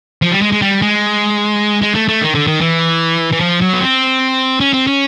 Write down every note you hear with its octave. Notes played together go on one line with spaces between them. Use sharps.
F3
G3
G#3
G#3
G3
G#3
G#3
A3
A3
D#3
D3
D#3
E3
E3
F3
F#3
B3
C4
C#4
C4
C#4